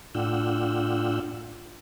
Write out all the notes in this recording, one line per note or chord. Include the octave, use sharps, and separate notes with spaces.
A2 D4 F4 F#5 G5 E6